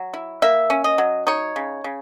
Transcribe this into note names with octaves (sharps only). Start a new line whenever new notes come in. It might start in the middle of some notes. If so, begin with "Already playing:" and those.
Already playing: F#3
E4
A#3 E5
C#4
D#5
F#3
D#4 C#5
C#3
C#3